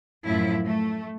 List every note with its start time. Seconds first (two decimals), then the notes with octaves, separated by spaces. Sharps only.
0.24 F#2 A2 F3 E4
0.67 A3